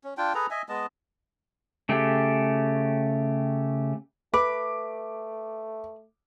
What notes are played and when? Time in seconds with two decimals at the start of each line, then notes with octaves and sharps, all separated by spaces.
0.04 C#4
0.17 D4 F4 G5
0.35 G#4 A4 B4 A#5
0.51 D#5 E5 G#5
0.69 G#3 B3 D#5 A5
1.89 C#3 A3 G4
4.34 A3 B4 D6